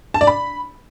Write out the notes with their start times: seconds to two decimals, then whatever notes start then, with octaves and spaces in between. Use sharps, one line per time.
0.14 A5
0.21 D5
0.27 B5